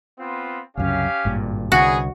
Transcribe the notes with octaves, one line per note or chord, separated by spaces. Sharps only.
B3 C4 F4
C2 F#2 C#3 C#4 G4 F5
G#1 G2 A#2
C2 D3 B3 C#4 F#4 G#4